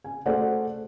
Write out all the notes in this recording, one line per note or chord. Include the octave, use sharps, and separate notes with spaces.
G#5
A3 F#4 G#4 C5 D5 F#5